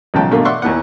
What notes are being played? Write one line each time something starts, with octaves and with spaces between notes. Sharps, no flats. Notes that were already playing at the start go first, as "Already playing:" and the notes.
B1 G#2 C#3 F3 G5 A5
G2 B2 A3 A#3
D5 E5 F#5 C6 C#6
D#2 E3 B3 F#5